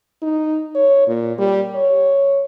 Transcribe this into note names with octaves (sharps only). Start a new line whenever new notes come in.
D#4
C#5
A#2
G3
C#5